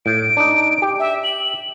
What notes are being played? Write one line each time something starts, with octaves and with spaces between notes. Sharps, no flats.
A2 D7
D4 D#4
G4
E5
F#7